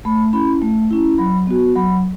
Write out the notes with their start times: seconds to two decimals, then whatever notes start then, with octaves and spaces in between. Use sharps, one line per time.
0.05 A3 B5
0.33 C#4 E4 B5
0.62 A3
0.90 C#4 E4
1.18 F#3 B5
1.47 B3 F#4
1.76 F#3 B5